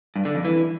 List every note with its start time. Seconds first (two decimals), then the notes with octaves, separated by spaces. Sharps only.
0.16 G2
0.25 D3
0.35 F2
0.45 E3